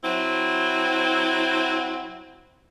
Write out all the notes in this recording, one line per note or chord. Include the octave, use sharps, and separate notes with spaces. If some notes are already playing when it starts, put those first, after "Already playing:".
F#3 C4 E4